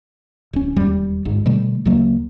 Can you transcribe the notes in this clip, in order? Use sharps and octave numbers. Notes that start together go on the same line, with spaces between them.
D1 C#4
E1 D#2 G3
G1 G#2
B2 D3 G3 A3
D2 C#3 F#3 A#3